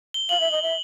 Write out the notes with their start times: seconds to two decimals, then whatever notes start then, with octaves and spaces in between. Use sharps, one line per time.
0.14 G7
0.29 F5 F#7
0.40 E5
0.51 D#5
0.62 E5